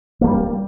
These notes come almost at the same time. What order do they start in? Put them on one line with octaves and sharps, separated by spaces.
A#3 A3 G3